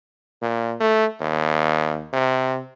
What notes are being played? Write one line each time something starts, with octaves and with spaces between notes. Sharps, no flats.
A#2
A3
D#2
C3